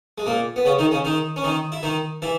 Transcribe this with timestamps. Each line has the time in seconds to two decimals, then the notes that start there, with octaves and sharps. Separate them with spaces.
0.18 G#3
0.26 A#2 A#3
0.56 B3
0.65 C#3 C#4
0.79 D#3 D#4
0.91 C#3 C#4
1.05 D#3 D#4
1.36 C#4
1.44 D#3 D#4
1.72 E4
1.83 D#3 D#4
2.22 E3 E4